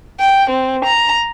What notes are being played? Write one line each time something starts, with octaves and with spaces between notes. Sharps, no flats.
G5
C4
A#5